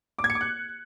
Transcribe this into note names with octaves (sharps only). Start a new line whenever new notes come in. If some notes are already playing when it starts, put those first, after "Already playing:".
D6
G#6
C#7
D6
F#6